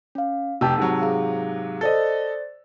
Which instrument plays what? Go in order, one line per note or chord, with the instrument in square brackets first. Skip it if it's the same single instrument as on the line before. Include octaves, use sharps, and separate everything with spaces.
[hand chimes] C#4 F5
[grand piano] F1 G4 [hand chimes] A5 E6
[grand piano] G#2 C3 F#3
[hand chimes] G#4 F5
[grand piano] A4 D#5 [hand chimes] C5 D5 A6